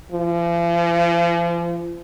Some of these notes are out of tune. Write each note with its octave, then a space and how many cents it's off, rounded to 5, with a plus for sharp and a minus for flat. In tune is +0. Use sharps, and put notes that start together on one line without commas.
F3 -40